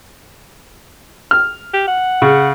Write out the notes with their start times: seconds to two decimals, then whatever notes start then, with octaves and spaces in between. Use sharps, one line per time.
1.31 F6
1.73 G4
1.88 F#5
2.22 C#3